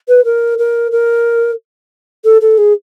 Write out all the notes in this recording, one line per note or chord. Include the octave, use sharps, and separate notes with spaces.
B4
A#4
A#4
A#4
A4
A4
G#4